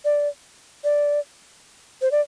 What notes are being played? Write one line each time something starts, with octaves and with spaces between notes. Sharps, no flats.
D5
D5
C5
D5